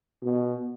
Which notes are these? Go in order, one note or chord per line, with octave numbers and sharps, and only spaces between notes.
B2